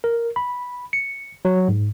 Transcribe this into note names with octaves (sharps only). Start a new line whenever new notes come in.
A#4
B5
C#7
F#3
G#2